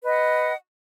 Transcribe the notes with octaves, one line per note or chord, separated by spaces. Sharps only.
B4 D#5 F#5